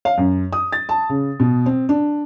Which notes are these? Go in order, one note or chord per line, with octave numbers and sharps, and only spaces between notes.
F5
F#2
D#6
A6
A5
C#3
B2
C4
D4